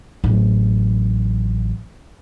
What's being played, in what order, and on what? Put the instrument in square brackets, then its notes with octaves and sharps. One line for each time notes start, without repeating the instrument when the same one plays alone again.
[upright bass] A1 F#3